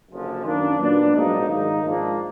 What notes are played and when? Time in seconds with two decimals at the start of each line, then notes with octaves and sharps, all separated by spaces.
0.09 F#1 F#2 D3 F3
0.44 F#2 D#3 A#3 D4
0.79 A#2 F#3 B3 D4
1.14 A#1 G#2 F#3 A#3 D#4
1.48 G#2 D#3 A#3 D#4
1.83 G#2 F3 A#3 D4